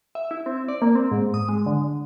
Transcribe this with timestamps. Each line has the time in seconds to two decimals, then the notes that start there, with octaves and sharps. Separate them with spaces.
0.15 E5
0.31 E4
0.46 C4
0.68 D5
0.82 A#3
0.95 C4
1.12 G#2
1.34 D#6
1.49 G#3
1.66 D3